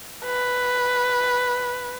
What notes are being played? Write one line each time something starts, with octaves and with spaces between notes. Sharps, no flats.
B4